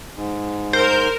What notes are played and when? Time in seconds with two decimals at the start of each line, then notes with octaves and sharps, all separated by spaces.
0.15 G#2
0.73 A#4 C5